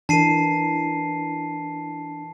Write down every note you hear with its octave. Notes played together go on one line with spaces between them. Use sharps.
E3 D4 A#4 A5 C7 D#7